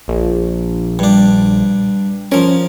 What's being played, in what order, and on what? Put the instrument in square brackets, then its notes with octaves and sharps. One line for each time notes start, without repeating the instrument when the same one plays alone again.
[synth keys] A#1
[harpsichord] G2 D4
[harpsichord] F3 A#4 [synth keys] C#4